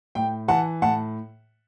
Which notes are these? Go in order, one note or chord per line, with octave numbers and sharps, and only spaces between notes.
A2 G5
E3 F#5 A5
A2 F#5 A5